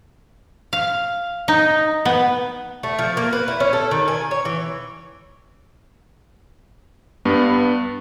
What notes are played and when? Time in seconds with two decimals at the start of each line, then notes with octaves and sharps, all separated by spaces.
0.73 F5
1.48 D#4
2.05 B3
2.83 A3
2.99 F3
3.17 A#3
3.33 B4
3.48 E4
3.60 C#4
3.73 A4
3.91 D#3
4.08 G#5
4.31 C#5
4.45 E3
7.25 G2 B3